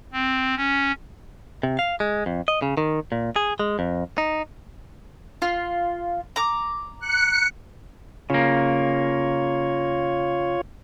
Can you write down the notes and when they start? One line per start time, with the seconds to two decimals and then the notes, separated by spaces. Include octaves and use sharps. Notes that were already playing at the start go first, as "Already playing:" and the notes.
0.13 C4
0.57 C#4
1.63 C3
1.79 F5
2.00 G#3
2.26 F2
2.48 D#5
2.62 C#3
2.77 D#3
3.12 A#2
3.36 G#4
3.59 G#3
3.79 F2
4.18 D#4
5.42 F4
6.36 A#5 D6
7.00 F#6 C#7
8.30 C#3 A#3 F4 C#5